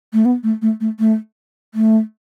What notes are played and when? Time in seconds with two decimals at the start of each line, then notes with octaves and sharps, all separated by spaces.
0.13 A3
0.25 B3
0.43 A3
0.62 A3
0.81 A3
0.99 A3
1.74 A3